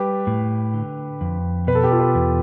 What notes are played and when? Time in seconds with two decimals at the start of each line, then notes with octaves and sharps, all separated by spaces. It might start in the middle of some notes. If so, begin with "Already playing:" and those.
Already playing: G3 G4 B4
0.27 A2
0.74 D3
1.21 F2
1.67 B2 B4
1.75 A4
1.83 G4
1.91 F4 A4
1.99 G4 B4
2.15 E2